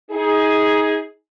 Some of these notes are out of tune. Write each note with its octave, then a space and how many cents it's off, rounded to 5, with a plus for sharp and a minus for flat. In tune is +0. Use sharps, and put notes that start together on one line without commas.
D#4 +30 G#4 +0